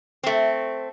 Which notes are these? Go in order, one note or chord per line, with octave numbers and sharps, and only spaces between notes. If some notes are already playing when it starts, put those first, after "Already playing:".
A3 C4